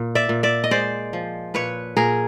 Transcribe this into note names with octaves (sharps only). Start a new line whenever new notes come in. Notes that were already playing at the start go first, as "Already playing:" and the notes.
Already playing: A#2
D5 E5
A#2
D5 E5
D#5
G#3 C5 D5
F3
A#2 B4 C#5
A#2 G#4 A#4